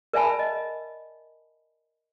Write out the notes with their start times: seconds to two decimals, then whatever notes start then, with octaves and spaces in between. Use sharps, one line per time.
0.13 A#4 D5 E5 G#5 A5 B5
0.39 D#5